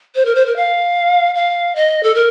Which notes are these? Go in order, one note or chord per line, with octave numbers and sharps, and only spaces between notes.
C5
A#4
C5
A#4
F5
F5
D#5
A4
A#4